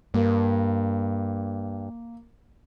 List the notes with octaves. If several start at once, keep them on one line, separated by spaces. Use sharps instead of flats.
G2 A#3